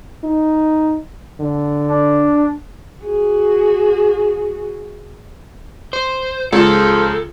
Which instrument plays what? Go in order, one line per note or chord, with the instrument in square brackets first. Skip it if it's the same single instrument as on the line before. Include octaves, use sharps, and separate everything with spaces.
[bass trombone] D#4
D3
[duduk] D4
[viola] F#4 G#4
[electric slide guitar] C5
[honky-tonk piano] C#2 C#3 [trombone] F3 [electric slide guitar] A4